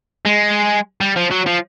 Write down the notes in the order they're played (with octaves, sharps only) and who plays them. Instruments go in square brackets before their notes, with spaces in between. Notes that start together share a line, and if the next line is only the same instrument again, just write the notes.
[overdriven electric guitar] G#3
G3
F3
F#3
F3